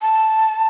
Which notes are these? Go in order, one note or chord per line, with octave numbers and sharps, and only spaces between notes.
A5